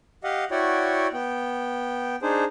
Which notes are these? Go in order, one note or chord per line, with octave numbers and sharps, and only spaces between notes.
G4 D#5 F5 F#5
E4 F#4 C#5 D5 F#5 G5
B3 G5
D4 D#4 G#4 C5